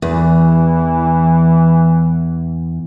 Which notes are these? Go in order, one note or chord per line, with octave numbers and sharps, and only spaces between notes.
E2 E3